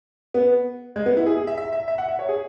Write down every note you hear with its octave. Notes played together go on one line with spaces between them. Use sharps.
B3
G#3
B3
E4
G#4
G#4
E5
E5
E5
E5
F#5
E5
C#5
G#4